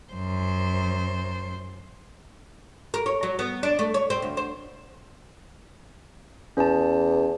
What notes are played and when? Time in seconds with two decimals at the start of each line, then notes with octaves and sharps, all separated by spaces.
0.13 F#2 C5
2.94 A#4
3.06 C#5
3.23 F#3
3.39 B3
3.63 D4
3.79 A3
3.94 C#5
4.10 C4
4.22 D2
4.37 C5
6.57 E2 C#4 A5